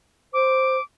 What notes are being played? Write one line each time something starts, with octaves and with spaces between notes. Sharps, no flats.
C5 D6